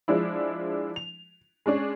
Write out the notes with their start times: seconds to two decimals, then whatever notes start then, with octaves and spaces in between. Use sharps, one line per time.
0.08 F3 G#3 D4 E4
0.96 F7
1.66 G#3 C#4 D4 G#4